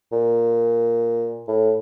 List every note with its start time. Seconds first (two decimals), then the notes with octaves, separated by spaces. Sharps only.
0.12 A#2
1.48 A2